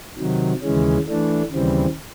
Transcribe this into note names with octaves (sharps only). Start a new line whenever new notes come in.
C3 D#3 F#3
D#2 C#3 E3 G#3 C#4
E3 A3 D4
D#2 C#3 E3 G3 C4